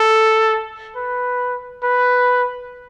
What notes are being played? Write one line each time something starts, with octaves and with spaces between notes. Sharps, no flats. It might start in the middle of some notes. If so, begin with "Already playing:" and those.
Already playing: A4
B4
B4